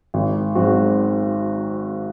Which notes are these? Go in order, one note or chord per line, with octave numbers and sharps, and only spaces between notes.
G#1
G#2 F#3 C4 F#4